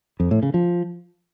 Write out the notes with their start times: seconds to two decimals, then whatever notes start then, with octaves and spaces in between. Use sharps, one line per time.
0.20 F2
0.31 A2
0.43 C#3
0.54 F3